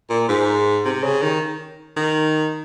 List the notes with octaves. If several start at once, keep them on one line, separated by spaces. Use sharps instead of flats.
A#2
G#2
C3
C#3
D#3
D#3